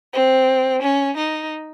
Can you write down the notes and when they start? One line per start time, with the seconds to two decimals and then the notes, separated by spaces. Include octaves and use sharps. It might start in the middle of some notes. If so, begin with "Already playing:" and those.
0.13 C4
0.82 C#4
1.16 D#4